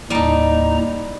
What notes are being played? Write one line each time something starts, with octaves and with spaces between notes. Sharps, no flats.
D#2 A2 G3 D#4 A#5